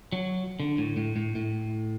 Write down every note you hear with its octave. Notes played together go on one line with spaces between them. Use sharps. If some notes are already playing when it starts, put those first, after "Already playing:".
F#3
D3
A2
A2
A2
A2